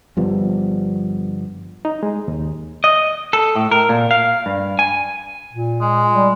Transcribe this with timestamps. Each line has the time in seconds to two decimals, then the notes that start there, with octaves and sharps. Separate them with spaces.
0.17 G1 F3 G3 B3
1.85 D#4
2.03 G#3
2.28 D#2
2.84 D#5
3.33 A4
3.55 A2
3.71 A#4
3.89 A#2
4.11 F5
4.46 G2
4.79 G#5
5.53 A#2
5.81 G#3
6.13 G3